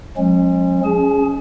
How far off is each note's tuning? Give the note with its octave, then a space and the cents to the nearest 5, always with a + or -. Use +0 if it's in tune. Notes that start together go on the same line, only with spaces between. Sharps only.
F3 +45 G#3 +0 C#4 -30
C#4 +0 G#4 +0 A5 -45